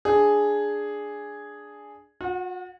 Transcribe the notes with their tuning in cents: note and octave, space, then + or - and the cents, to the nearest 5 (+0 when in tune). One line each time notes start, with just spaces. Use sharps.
D4 +0 G#4 +0
F#4 -45 F#5 +0